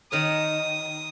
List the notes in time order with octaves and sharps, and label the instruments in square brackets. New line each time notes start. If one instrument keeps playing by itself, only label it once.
[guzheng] D#3 A#4 C#5 [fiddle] D#6